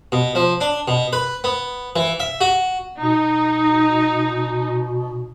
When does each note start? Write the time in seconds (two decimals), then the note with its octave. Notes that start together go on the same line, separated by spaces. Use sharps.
0.12 B2
0.35 F3
0.61 D4
0.88 B2
1.13 B4
1.44 B3
1.96 E3
2.20 E5
2.41 F#4
3.01 B2 D#4